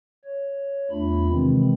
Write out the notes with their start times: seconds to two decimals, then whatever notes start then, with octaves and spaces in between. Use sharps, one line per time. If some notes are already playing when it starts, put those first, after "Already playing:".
0.25 C#5
0.91 E2 A3 D4 F4 B5
1.29 C3 D#3 E3 G#3 C4